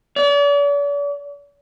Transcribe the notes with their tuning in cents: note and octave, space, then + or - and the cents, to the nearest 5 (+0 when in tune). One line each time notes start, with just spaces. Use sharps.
D5 -45